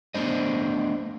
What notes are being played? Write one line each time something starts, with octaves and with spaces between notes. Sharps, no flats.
A3 B3 D4 C5 D#5